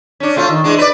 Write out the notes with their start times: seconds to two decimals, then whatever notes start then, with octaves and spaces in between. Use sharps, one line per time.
0.20 C#4 D4
0.36 C3 A3 F4
0.49 D#3
0.64 E3 G#3 D4
0.78 B4 D5